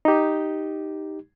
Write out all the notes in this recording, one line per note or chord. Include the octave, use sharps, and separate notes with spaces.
D#4 G4